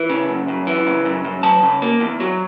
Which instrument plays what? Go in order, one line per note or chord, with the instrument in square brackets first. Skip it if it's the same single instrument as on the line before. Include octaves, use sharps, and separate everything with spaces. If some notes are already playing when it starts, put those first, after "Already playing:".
Already playing: [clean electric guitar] E3
C#3
F#2
F#2
E3
C#3
F#2
F#2
F#3 A5
C#3
A#3
E2
F#3